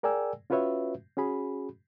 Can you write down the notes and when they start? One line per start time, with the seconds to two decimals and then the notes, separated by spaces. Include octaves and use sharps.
0.03 G#4 A#4 D5 G5 G#5 E6
0.50 C#4 F4 F#4 B4 C#5 E5
1.17 C#4 F#4 G#4 B5